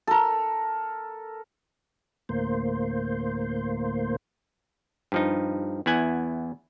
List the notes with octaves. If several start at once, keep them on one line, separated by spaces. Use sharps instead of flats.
A4 A#4
D2 A2 A#3 C5
G2 F3 D#4
E2 B3 E4 F#5 G#5